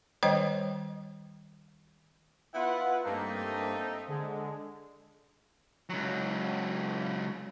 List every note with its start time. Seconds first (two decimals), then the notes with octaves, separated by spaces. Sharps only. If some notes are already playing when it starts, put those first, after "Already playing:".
0.23 D#3 G3 C5 C#5 D#5 G5
2.54 B3 E4 F4 B4 F#5
3.04 G2 A3 A#3 C4 D#4
4.08 D3 G#3
5.89 C#2 F#3